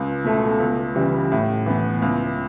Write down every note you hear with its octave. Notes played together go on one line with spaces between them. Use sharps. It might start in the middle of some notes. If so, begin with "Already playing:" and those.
Already playing: C#2
B2 A3
C#2
C#3 E3 G3
A2
E3 B3
C#2